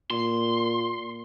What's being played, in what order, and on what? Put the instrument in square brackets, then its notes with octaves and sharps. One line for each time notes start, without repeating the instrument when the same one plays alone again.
[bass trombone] A#2 [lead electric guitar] C6